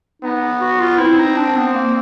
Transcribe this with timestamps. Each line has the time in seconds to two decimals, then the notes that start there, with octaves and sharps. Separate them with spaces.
0.22 B3 D#4
0.61 F#4
0.80 F4
0.99 C4 E4
1.18 D#4
1.37 D4
1.56 B3
1.75 A#3